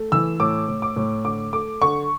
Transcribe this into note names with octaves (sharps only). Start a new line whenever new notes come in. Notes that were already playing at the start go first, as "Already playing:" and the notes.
Already playing: A3
E3 E6
A2 D6
A2
D6
A2
D3 D6
A3 D6
D3 C#6